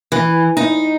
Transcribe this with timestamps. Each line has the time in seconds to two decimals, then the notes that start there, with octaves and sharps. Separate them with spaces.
0.12 E3
0.57 D#4